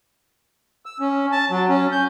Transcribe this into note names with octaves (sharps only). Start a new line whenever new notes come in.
E6
C#4
A5
F#3
C#4
G6